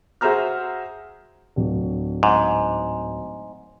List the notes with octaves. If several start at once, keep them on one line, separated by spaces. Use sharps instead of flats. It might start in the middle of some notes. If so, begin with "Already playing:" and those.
F#4 G#4 C5 E5 A#5 F6
D1
G#2